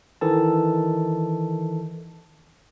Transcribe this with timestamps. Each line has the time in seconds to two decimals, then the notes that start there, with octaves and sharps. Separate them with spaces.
0.21 D#3 E3 A4 A5